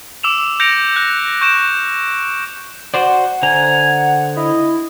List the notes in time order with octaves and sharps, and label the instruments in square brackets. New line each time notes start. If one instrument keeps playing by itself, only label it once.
[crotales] D6 E6 E7 F7
G6 A#6 C#7 D7 F7
F#6 A#6
C#6 G6 D7 E7
[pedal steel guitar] F#4 C5 D5 [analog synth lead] F#5
[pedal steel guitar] D3 C5 A#5 [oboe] G#5
[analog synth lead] E4 [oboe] D#5